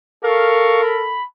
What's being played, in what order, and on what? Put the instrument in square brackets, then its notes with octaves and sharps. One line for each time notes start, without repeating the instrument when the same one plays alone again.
[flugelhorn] A4 [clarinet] A#4 [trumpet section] F5 C#6
[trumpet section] B5